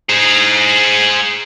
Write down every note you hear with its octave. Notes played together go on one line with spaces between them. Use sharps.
G#4 C5